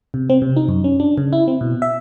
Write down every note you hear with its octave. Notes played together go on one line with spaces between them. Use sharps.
C3
C4
C3
D#4
F#2
C#4
D4
C#3
E4
C4
B2
E5